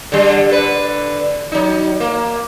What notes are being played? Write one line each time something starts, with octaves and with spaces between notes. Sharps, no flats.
D3 G3
D3 B4
F#3 D#4
A#3